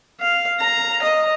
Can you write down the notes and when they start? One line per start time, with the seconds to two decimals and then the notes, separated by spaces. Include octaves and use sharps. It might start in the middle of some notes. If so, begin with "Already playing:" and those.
0.20 F5
0.59 A#5
1.02 D#5